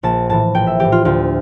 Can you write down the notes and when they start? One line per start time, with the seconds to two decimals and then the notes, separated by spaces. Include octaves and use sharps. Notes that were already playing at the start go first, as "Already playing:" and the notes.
0.03 A#1 A5
0.29 A2 E3 A5
0.54 A#1 G5
0.67 E5
0.80 A2 E3 G4
0.92 F4
1.05 D2 F4